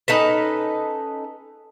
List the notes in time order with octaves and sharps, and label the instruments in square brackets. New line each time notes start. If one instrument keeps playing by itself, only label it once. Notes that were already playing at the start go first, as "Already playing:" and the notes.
[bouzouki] C#4 D#4 A4 B4